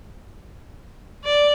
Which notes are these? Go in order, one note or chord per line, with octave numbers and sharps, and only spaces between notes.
D5